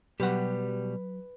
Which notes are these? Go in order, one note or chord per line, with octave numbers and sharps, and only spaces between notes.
B2 F#3 G3 G4 B4 F#5